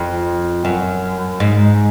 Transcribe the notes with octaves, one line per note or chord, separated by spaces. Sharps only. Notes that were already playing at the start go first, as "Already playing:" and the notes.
Already playing: F2
F#2
G#2